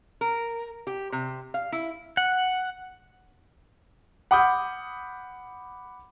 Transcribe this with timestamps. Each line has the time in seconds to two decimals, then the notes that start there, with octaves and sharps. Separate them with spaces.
0.21 A#4
0.87 G4
1.12 C3
1.54 F5
1.72 E4
2.17 F#5
4.31 F#5 B5 D6 D#6 F6 G6